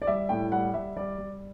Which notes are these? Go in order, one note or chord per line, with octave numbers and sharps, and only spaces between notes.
D5
G3 E5
A2 G5
G3 F#5
G3 E5
G3 D5
G3